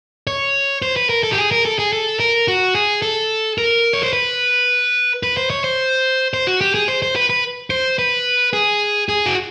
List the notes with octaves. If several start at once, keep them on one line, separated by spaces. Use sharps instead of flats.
C#5
C5
B4
A#4
A4
G4
G#4
A#4
A4
G#4
A4
A#4
F#4
G#4
A4
A#4
C#5
C5
B4
B4
C5
C#5
C5
C5
F#4
G4
G#4
C5
C5
B4
B4
C5
B4
G#4
G#4
F#4